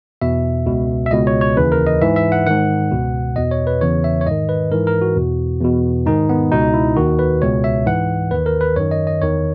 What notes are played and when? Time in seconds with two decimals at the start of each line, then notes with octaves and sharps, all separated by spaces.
0.22 E2 B2 E5
0.66 C#2 B2
1.06 E5
1.11 C#2 B2 D#5
1.27 C#5
1.41 C#5
1.57 D#2 C#3 E3 B4
1.72 A#4
1.87 D#5
2.02 G#2 E3 E5
2.16 E5
2.32 F#5
2.46 G#2 D#3 F#5
2.92 C#2 B2
3.36 E2 B2 D#5
3.51 C#5
3.67 B4
3.81 E2 C#3 E3 C#5
4.04 E5
4.21 C#5
4.26 G#2 D#3 D#5
4.49 B4
4.71 G#2 E3 A#4
4.87 A#4
5.02 F#4
5.16 E2 B2
5.61 E2 B2
6.06 G#2 D#3 D#4
6.29 B3
6.51 C#2 B2 D#4
6.74 E4
6.96 D#2 D#3 F#4
7.19 B4
7.42 C#2 B2 C#5
7.64 E5
7.86 G#2 E3 F#5
8.31 D#2 D#3 B4
8.46 A#4
8.61 B4
8.76 F#2 D#3 C#5
8.91 D#5
9.07 D#5
9.22 E2 D#3 C#5